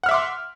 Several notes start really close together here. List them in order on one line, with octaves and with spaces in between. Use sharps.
F#5 F6 E5 D6 C6